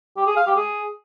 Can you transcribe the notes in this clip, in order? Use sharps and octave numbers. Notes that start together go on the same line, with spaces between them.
G4
G#4
F5
G4
G#4